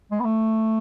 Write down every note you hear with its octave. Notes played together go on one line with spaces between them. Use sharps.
G#3
B3
A3